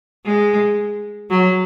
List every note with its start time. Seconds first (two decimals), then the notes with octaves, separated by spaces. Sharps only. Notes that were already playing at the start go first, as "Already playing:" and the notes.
0.25 G#3
1.30 F#3